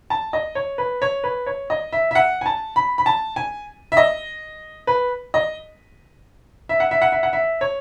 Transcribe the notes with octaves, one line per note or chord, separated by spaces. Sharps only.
A5
D#5
C#5
B4
C#5
B4
C#5
D#5
E5
E5
F#5
G#5
A5
B5
B5
A5
G#5
E5
D#5
B4
D#5
E5
F#5
E5
F#5
E5
F#5
E5
C#5